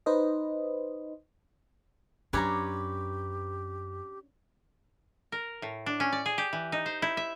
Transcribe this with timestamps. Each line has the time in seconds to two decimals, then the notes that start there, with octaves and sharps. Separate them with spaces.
0.06 D#4 B4 C5 D#5
2.33 F#2 C#4 D4 G4 B4 C#5 A#5
5.32 A#4
5.62 A2
5.86 D4
6.00 C#4
6.13 D5
6.26 G#4
6.38 G4
6.53 E3
6.72 D#4
6.86 C5
7.02 E4
7.17 E5